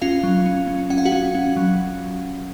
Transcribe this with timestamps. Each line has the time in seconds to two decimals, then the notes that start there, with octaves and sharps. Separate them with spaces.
0.02 C#4 F4 F5
0.23 F#3
0.46 C#4
0.67 C#4
0.90 C#4 F#5
0.98 F5
1.05 F#4 F#5
1.12 C#4
1.35 C#4
1.56 F#3